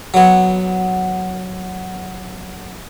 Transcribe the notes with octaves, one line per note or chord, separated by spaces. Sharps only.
F#3 B3